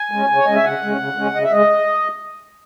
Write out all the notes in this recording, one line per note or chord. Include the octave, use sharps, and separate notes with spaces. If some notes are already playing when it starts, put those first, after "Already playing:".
Already playing: G#5
G#3 C#4
C#3
C#5
G#3 C#4 D#5
E5
C#3 F#5
G#3 C#4
C#3
G#3 C#4
C#3 D#5
E5
G#3 D#5